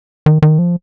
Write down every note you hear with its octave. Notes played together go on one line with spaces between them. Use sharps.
D#3
D#3
F3